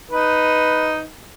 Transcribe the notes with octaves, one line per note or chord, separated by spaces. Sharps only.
D#4 B4